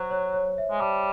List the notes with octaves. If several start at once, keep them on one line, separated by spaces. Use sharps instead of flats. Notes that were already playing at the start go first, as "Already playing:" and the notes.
Already playing: F#3 C5
C#5
C#5
E5
G#3
G3 A5